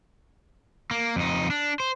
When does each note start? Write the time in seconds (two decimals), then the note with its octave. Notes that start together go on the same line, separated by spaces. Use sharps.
0.91 A#3
1.16 F2 D#4
1.50 D4
1.80 C5